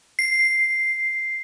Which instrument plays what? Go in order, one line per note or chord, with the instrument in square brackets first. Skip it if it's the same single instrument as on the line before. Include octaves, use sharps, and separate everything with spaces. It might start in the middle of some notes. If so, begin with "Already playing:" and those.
[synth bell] C7